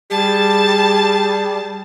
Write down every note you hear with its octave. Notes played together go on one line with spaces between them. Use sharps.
G3 G#4 A5